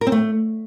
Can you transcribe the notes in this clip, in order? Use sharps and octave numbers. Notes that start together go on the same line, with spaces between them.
A#4
C4
A3